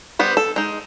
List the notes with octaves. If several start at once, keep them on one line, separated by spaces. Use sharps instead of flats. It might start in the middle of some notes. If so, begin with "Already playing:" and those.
G3 B3 C5
A4
G#3 D#4